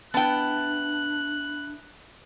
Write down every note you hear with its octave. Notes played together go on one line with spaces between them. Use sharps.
B3 D4 E4 G5 A5 F#6